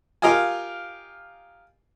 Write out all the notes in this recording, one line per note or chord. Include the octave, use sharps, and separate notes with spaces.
F4 G4 A#4 D#5 F5 G#5